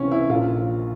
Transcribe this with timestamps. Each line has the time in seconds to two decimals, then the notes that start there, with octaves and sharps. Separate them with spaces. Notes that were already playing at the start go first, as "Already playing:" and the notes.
Already playing: C#2 C3 E3 C#4
0.12 E4
0.29 A#1 A#2 F4